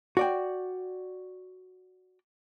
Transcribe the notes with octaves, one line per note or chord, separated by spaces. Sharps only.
F#4 D5 G5